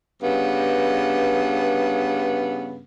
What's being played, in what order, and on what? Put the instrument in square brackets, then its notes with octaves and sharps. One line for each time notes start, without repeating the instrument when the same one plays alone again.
[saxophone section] G2 C#3 B3